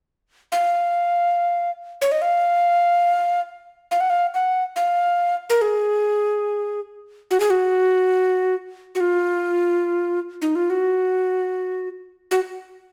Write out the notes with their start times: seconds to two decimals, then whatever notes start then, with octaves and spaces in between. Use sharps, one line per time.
0.52 F5
2.02 C#5
2.12 D#5
2.22 F5
3.91 F5
4.00 F#5
4.10 F5
4.34 F#5
4.76 F5
5.50 A#4
5.62 G#4
7.31 F#4
7.40 G#4
7.50 F#4
8.95 F#4
9.00 F4
10.42 D#4
10.55 F4
10.70 F#4
12.31 F#4